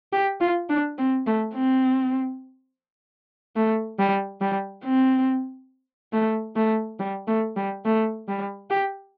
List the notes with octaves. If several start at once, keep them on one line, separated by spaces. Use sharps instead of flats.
G4
F4
D4
C4
A3
C4
A3
G3
G3
C4
A3
A3
G3
A3
G3
A3
G3
G4